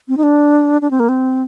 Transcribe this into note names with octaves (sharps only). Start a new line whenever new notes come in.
C4
D#4
D4
D4
C4
A#3
C4